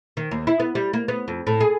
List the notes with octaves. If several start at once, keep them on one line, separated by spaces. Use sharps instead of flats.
D#3
D#2
E4
B3
G3
A#3
B3
F2
A2
G#4